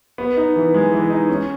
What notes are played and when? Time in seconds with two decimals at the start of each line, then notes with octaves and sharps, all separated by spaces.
0.18 B3
0.37 D#4
0.56 E3
0.74 G#3
0.92 E3
1.10 D#4
1.29 C#4